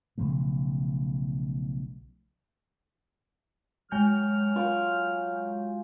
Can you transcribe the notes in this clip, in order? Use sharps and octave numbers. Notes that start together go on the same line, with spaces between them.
B1 C#3 F3 A3
F#3 G#3 G#5 F6 G6
F4 C#6 D6